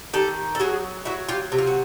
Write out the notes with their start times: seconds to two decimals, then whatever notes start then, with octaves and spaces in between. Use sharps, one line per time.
0.13 D#3 G4 A4
0.55 A4
0.60 F#3 F#4 G#4
1.05 F#3 E4 F#4
1.29 F4 G4
1.52 C3
1.58 F4
1.67 F#4